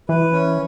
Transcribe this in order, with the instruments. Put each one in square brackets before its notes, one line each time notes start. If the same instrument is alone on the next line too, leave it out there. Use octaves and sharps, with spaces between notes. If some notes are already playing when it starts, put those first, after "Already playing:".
[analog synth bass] E3 [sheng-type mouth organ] B4
[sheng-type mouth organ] C#4